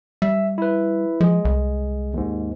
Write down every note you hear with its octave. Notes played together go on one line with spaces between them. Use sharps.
G3 E5
E4 B4
F3 G#3 G#4
C2
D#2 G#2